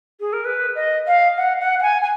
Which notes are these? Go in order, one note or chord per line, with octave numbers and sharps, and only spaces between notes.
G#4
A#4
B4
D#5
F5
F#5
F#5
F#5
G#5
G#5